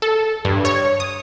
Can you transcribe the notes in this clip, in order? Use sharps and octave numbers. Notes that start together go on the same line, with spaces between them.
A4
G2
C#5
D#6